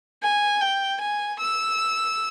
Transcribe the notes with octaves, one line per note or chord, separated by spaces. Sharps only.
G#5
G5
G#5
E6